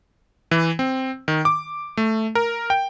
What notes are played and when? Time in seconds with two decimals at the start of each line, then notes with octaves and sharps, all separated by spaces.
0.51 E3
0.79 C4
1.28 D#3
1.45 D6
1.97 A3
2.35 A#4
2.70 G5